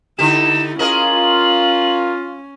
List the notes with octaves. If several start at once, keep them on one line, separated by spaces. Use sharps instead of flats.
D3 D#4 E4 G4 E7
C#4 F4 G#4 A#4 D#5 F#7